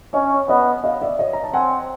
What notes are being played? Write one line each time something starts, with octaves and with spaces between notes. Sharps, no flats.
C#4 C#5 D#5
B3 C#5 D#5
D#5 F5
D5 E5
C#5 D#5
A#5
A5
C4 F#5 G#5